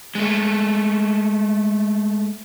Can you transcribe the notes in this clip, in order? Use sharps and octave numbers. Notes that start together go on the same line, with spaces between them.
G#3 A3